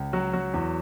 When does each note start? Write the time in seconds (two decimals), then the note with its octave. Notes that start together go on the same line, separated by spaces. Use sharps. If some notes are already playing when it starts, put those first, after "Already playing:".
Already playing: C#2
0.13 F#3 F#4
0.33 F#3 F#4
0.54 E2